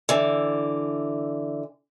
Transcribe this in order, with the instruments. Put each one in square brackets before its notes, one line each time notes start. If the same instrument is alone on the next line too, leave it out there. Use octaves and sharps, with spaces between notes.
[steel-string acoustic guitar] D3 E3